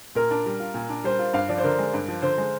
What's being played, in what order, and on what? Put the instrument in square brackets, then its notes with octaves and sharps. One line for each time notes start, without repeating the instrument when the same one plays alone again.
[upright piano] A#2 [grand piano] A#4
[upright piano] D4
G3
F4
A#2
D4
[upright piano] G3 [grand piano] C5
[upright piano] F4
[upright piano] G2 [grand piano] F5
[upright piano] F3 [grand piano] D5
[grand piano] C5
[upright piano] D3 [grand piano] A#4
[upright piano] G#3
G2
F3
[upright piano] D3 [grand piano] C5
[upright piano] G#3